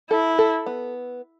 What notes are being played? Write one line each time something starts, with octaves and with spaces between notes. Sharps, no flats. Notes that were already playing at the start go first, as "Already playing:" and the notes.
E4 A4
A4
B3